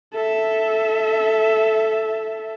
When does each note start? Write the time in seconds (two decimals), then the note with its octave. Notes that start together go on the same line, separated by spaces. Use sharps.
0.13 A4 E5